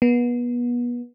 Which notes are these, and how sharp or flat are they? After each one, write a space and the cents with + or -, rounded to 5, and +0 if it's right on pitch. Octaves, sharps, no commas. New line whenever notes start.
B3 -30